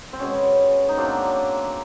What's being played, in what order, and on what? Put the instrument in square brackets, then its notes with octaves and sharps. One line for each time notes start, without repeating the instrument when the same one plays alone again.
[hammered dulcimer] C4
B2 G#3 B3 C#4
D#4
B2 F#3 A#3 C4 D4